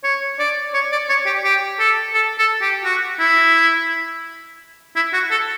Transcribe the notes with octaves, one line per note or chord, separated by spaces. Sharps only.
C#5
D5
C#5
D5
C#5
G4
G4
A4
A4
A4
G4
F#4
E4
E4
F#4
A4